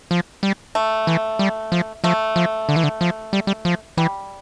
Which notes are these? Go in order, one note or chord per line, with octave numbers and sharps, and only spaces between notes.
F3
G3
A3
E3
G3
F3
F3 A3
F3
D3
E3
D3
F3
G3
G3
F3
E3 G3